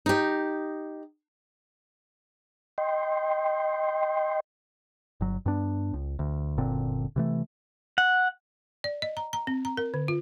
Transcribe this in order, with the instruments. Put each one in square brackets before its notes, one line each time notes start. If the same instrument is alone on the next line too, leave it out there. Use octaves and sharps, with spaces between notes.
[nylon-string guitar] D#4 G4
[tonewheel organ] D#5 G5 C6
[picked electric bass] G1 F#3
G2 B3 D4
C#2
D2
F#1 A#2 D3 C4
C3 E3 A3
[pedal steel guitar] F#5
[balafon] D5
D#5
A#5
A#5
C4
A#5
A#4
D3
F4